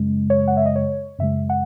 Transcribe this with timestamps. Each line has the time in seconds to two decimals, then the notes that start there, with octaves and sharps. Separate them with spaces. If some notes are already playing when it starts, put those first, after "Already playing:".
Already playing: F#2 C#3 G#3
0.30 C#5
0.48 F#5
0.57 E5
0.66 D#5
0.76 C#5
1.19 F#2 C#3 G#3 E5
1.50 F#5